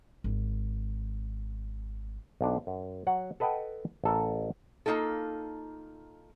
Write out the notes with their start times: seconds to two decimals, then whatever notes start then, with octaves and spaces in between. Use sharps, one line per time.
0.24 G#1 D#4
2.41 B1 D4
2.67 F#2
3.07 F#3 F#5
3.40 A4 B4 D#5 F#5 G5
4.04 A1 A4 A#4
4.86 A#3 C4 D#4 F4 A4